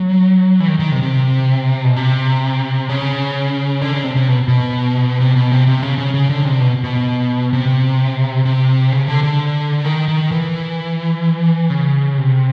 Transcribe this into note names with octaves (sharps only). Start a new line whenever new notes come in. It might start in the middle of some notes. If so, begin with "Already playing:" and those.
Already playing: F#3
E3
D#3
D#3
C3
C3
B2
C3
C#3
D3
C#3
C3
C3
B2
B2
C3
B2
C3
C3
C#3
C#3
C#3
D3
C3
B2
B2
C3
C3
C#3
D3
D3
D#3
D#3
E3
C#3
C3